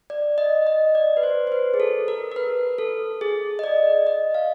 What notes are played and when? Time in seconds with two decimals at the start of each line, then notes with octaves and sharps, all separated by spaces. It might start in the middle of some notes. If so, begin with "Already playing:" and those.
0.10 D5
0.38 D#5
0.67 D#5
0.95 D5
1.17 B4
1.23 C5
1.47 C5
1.52 B4
1.74 G#4
1.80 A4
2.08 A#4
2.32 A#4
2.36 B4
2.78 A4
3.21 G#4
3.59 D#5
3.64 D5
4.07 D#5
4.35 F5